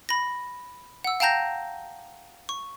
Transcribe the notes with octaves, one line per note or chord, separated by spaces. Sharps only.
B5 A#6
F#5 E6
F5 G5 A5 A#5 G6 A#6
C#6